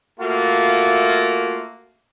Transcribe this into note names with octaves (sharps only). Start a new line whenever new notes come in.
A3 A#3 F4 F#4